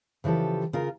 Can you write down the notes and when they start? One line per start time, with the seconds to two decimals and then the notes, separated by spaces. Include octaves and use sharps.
0.24 C#3 E3 F3 G4 A4
0.73 C#3 F4 A#4